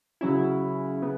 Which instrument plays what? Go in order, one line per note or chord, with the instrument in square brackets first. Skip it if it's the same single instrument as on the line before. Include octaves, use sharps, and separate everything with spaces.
[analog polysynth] C#3 F#3 C#4 E4
C#3 B3